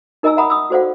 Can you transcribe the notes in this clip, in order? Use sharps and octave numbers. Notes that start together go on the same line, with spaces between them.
D#4 A#4 D#5 G#5 A#5 E6
E5 F#5 A#5 B5 D#6
D#6 E6
F#4 A4 C5 D5 F5 F#5